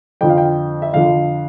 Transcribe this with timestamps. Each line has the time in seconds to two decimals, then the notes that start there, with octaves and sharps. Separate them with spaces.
0.21 F2 D3 F3 G5
0.30 F5
0.38 G5
0.82 E5
0.93 F2 D3 F3 F5